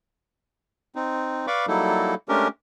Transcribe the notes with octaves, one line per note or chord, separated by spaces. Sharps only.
C4 D#4
B4 D5 F5 B5 C#6 D6
F#3 G3 A#3 D#4 E4 A4
G#3 A3 C#4 D4 G4 A#4